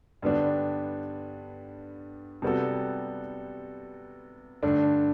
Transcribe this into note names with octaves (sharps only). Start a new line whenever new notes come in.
G2 D3 G3 B3 D4
C3 G3 B3 F#4 A4
G2 D3 A3 D4